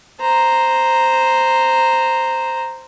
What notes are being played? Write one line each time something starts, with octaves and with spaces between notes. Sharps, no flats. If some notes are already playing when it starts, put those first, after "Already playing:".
C5 A#5